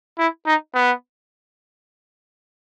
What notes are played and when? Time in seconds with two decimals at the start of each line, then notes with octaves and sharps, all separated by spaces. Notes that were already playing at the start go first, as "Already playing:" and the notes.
0.19 E4
0.46 D#4
0.74 B3